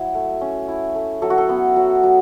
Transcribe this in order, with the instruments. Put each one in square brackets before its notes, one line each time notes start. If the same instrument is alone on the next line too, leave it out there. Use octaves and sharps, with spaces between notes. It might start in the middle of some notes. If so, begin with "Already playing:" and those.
Already playing: [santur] F#3 E4
A3
C#4
E4
A3
F#3 A4
F#4
A4
B3
F#3
F#3